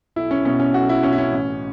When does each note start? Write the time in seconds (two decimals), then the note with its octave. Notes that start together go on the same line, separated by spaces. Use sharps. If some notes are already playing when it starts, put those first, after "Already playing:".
0.16 B1 E4
0.31 C#4
0.45 B2 C#4
0.60 C#4
0.74 B1 F#4
0.89 E4
1.03 B2 C#4
1.12 E4
1.18 C#4
1.32 A1